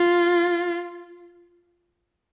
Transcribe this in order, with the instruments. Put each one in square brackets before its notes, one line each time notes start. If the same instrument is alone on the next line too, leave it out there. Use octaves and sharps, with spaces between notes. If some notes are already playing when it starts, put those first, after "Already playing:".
Already playing: [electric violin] F4